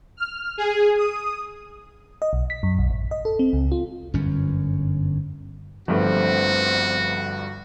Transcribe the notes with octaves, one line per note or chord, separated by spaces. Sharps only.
F6
G#4
D#6
D#5
B1
B6
F#2
B1
A1
D#5
A4
C4
C#2
F4
G1 F#2 C#4
G1 G2 F3 A3 C4 F#4